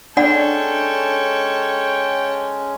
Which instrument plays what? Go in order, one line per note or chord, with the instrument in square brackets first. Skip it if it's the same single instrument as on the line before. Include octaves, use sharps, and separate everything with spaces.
[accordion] G#3 C#4 [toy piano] D4 D5 F#5 [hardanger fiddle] A4 C#5 [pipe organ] G5